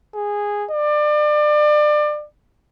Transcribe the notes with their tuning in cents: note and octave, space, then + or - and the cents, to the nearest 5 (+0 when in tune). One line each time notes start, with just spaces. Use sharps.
G#4 -10
D5 +30